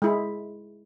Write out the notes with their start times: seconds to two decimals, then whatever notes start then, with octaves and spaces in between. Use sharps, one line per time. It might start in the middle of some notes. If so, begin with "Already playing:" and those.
0.02 G#3 E4